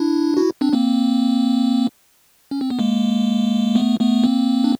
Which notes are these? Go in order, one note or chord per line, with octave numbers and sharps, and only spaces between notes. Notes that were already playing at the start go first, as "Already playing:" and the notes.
Already playing: D4 E4
E4 F#4
C4 D4
A#3 C4
C#4
C4
B3
G#3 A#3
A3 B3
A3 B3
A#3 C4
D4